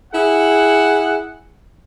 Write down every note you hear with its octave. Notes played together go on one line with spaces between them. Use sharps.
E4 G#4 F#5